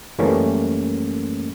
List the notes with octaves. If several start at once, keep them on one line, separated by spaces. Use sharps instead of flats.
F#2 E3 G3 A3 A#3 C#4